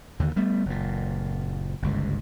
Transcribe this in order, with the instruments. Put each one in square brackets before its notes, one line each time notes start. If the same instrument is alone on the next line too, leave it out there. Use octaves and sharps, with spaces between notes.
[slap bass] D#2 D3
G3 A3 B3
F#1 A#2
G1 C#2 G#2